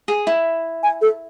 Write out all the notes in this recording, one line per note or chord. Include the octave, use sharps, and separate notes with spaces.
G#4
E4
G#5
A4